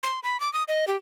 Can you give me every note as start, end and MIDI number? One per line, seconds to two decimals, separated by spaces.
0.03 0.20 84
0.23 0.40 83
0.40 0.52 86
0.53 0.63 87
0.68 0.85 75
0.88 0.97 67